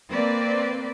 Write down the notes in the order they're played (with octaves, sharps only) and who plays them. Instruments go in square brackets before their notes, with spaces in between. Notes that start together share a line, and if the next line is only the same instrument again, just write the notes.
[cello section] A#3 C4 B4 D5